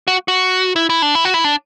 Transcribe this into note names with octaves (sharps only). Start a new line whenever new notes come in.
F#4
F#4
E4
E4
D4
E4
F#4
E4
D4